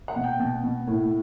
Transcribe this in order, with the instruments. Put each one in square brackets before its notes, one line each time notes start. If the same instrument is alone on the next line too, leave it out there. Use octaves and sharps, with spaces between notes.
[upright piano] F#5
B2
G5
B2
B2
A2